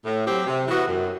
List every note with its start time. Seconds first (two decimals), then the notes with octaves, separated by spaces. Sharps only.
0.06 A2
0.26 F#3 C4 G4
0.47 C3
0.67 E3 B3 F#4
0.88 F#2